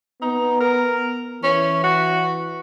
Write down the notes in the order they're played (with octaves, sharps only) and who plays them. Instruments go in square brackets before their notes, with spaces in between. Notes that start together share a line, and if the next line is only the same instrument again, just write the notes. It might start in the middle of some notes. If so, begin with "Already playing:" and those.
[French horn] B3 [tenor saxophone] D#4
[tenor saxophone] A#4
[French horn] E3 [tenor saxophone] C#4
[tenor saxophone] F#4